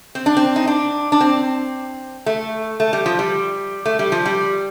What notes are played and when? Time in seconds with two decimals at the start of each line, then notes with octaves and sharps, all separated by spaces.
0.15 C4
0.26 D4
0.37 C4
0.56 D#4
0.67 D4
1.12 D4
1.21 C4
2.26 A3
2.80 A3
2.93 G3
3.06 F3
3.19 G3
3.85 A3
3.99 G3
4.12 F3
4.26 G3